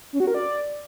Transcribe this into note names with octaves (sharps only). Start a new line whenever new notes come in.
C#4
F#4
A#4
D5